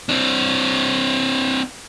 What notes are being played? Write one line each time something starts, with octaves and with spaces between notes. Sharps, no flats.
C4 D4